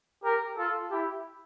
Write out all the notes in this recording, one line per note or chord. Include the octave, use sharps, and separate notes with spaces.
G4 A#4
F4 A4
E4 G4